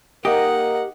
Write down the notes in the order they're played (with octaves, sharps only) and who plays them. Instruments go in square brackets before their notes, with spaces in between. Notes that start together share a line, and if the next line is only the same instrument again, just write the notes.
[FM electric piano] A#3 D#4 D#5 [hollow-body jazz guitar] G4 [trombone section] A#4 [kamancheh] F#5